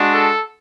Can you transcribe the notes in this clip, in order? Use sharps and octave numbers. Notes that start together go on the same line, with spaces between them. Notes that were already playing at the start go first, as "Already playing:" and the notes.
Already playing: G#3 D4 F#4
A4